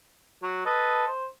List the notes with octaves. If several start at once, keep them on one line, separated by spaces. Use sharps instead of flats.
F#3
A4 B4 D#5
C5